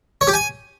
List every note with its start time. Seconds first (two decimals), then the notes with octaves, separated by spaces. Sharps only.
0.21 C#5
0.27 G4
0.34 G#5